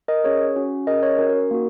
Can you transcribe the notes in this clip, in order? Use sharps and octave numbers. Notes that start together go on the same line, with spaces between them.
A#4 D#5
C#4 G#4 C#5
C#4 F#4
C#4 G#4 A#4 D#5
C#5
C#4 F#4 A#4
A#4
A#4
A#3 D#4 F#4